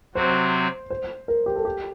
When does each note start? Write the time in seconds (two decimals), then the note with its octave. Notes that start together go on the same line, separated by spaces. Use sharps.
0.15 C3 F#3 C4 F#4 C5
0.90 C5
1.28 A#4
1.46 G4
1.56 A4
1.65 G4